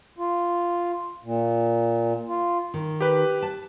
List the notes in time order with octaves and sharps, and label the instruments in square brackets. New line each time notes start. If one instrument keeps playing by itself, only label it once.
[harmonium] F4
A#2
F4
[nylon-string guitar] D#3
[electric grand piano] G4 B4
[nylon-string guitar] A5